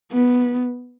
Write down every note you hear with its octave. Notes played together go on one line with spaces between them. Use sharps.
B3